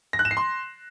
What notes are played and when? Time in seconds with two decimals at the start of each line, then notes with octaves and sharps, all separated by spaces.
0.13 A#6
0.19 F#6
0.25 E7
0.31 C7
0.37 C6